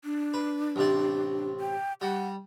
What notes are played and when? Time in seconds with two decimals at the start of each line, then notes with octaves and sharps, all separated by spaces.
0.04 D4
0.34 B4
0.76 A1 C3 D5
1.60 G5
2.01 G3 F#5